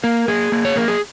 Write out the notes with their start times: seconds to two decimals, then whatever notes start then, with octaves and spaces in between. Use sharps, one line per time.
0.04 A#3 A#4
0.28 A#3 G#4
0.52 A#3
0.65 C#5
0.76 A#3 A#4
0.88 G#4